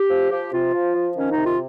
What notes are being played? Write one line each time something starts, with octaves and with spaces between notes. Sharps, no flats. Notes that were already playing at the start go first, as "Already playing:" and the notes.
Already playing: G4
F3
F3 G4
C3 F4
F3
F3
D#3 C#4
D#4
C3
F4